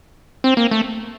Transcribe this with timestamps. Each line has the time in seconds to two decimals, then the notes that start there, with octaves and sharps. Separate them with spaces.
0.44 C4
0.57 A#3
0.71 A3